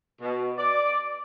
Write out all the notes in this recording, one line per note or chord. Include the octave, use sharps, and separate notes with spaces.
B2
D5